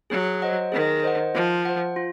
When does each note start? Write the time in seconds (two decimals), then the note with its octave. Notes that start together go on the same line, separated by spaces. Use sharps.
0.10 F#3 G#4
0.42 C5 D#5 F#5
0.72 D#3 G#4
1.03 C5 D#5 F#5
1.34 F3 F4
1.65 C5 F#5
1.96 F4